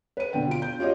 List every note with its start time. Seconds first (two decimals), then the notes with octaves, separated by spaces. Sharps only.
0.17 B4 D#7
0.33 B2 D3 G5
0.47 F4 D7
0.62 G6
0.79 C#4 F4 G4 C#5 D#5